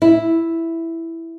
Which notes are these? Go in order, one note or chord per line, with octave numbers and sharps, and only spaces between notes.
E4